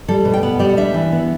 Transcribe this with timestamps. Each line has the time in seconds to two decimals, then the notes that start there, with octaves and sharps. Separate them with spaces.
0.08 G3 A4
0.25 B2
0.33 G5
0.43 B3 F#5
0.59 G3 D5
0.70 F#5
0.77 D4 E5
0.94 E3
1.12 B3